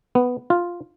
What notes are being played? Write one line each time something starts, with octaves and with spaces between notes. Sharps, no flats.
B3
F4